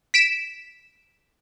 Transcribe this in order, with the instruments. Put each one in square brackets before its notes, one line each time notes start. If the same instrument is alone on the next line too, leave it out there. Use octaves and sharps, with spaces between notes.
[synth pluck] B6 D7 E7